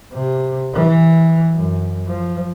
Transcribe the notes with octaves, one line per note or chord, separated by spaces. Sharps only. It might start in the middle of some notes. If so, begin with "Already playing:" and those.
C3
E3
F#2
F3